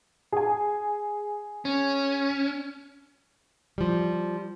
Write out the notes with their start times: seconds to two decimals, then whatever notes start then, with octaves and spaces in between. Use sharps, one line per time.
0.32 G#4 G#5
1.65 C#4
3.78 F3 G3